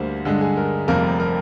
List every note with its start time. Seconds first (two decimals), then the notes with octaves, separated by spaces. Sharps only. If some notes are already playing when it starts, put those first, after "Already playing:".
Already playing: D2 D3 G3 A#3 C5
0.25 G2 D3 G#3
0.41 G#4
0.57 A#4
0.88 F1 F2 C3 G3 A#3 A#4
1.20 A#4